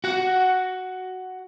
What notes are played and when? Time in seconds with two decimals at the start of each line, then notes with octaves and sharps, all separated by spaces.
0.04 F#4 F#5